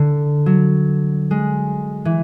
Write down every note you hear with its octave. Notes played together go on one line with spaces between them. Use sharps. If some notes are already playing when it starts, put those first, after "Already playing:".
Already playing: D3
F#3
G#3
E3